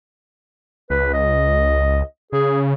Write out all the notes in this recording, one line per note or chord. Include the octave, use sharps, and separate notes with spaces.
C#2 B4
D#5
C#3 G#4